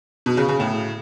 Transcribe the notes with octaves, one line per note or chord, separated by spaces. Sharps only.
B2
C#3
C#3
A2